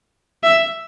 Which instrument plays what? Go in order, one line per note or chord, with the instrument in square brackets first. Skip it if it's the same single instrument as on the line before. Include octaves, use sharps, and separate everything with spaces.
[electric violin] E5